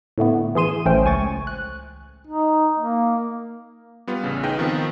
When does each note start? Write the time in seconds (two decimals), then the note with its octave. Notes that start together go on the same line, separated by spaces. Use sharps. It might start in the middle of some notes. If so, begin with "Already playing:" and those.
0.18 A2 D3 A3 B3
0.55 E3 G#4 C6 D#7 E7
0.86 A1 A3 C#4 C5 G5
1.05 C#2 G#5 C#6 A6
1.47 F#6
2.27 D#4
2.80 A#3
4.07 G3 B3 F4
4.23 A1 C#3
4.43 D#4 G#4 B4 D#5 G5
4.59 D#3 F3 B3 C4